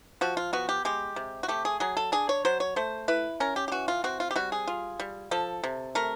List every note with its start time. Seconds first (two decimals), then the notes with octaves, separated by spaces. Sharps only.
0.21 F3 F#4
0.37 F4
0.53 B3 F#4
0.69 G4
0.85 G#3 G4
1.16 C3
1.43 F#4
1.48 A3 G4
1.65 G#4
1.80 F#3 G#4
1.97 A4
2.12 D4 G#4
2.29 C#5
2.45 F#3 C5
2.60 C#5
2.76 A3 C5
3.08 E4 B4
3.40 C#4 A#4
3.56 G4
3.68 G4
3.72 E3 F#4
3.88 F4
4.04 C4 F#4
4.20 F4
4.31 G4
4.36 G3 F#4
4.52 G#4
4.67 F4
5.00 G3
5.31 F3 A4
5.64 C3
5.95 A3 A#4